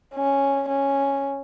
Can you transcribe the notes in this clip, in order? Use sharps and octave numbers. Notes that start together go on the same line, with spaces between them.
C#4
C#4